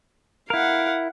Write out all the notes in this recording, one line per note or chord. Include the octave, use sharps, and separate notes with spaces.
E4 A#4 F5 F#5